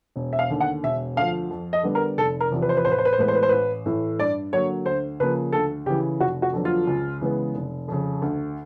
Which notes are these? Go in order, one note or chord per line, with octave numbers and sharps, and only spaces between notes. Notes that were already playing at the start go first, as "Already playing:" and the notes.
E1
E5
F5
D#2 D3
F#5
E1 E5
D2 D3 F3 F5
F2
D#5
D3 G3 B3
A#4
F1 A4
A#4
E2 C3 F3
B4
C5
B4
A1 C5
B4
C5
B4
C5
A2 E3 G#3 B3 B4
C5
B4
C5
A1 B4
A2 E3 A3
G2 D5
D3 F#3 A#3 C#5
D2 C5
C#3 F3 A#3 B4
D2 A4
C#3 E3 G4
F1 F#4
F#4
F2 D3 F#3 B3
F4
C#2
C#3 E3 G#3 B3
F1
F2 C#3
D2